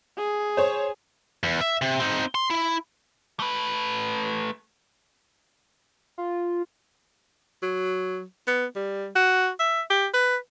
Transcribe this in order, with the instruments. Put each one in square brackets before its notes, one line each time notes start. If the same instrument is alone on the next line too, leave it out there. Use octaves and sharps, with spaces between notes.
[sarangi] G#4
[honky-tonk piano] C5 C#5
[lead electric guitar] E2
E5
C3
C4 D#4
C6
E4
A3 B4
[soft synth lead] F4
[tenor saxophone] F#3
B3
G3
F#4
E5
G4
B4